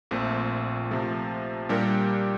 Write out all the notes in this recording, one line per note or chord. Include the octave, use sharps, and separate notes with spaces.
A#1 A#2 A3 C4
C3 F3 A3
A#2 G3 D4 G4 A#4